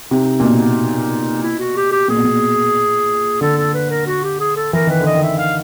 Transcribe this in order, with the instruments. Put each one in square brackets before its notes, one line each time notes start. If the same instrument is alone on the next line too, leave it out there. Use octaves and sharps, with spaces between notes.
[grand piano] C3 [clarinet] D#4
[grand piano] A#2
B2
[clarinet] E4
F#4
G4
G4
[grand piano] A#2 [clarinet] G#4
[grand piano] B2
A#2
[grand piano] D3 [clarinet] A4
[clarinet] A4
B4
A#4
F#4
G4
G#4
A4
[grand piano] E3 [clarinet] A#4
[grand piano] D#3 [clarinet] B4
[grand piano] D3
[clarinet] D#5
[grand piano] D#3
[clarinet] E5
F5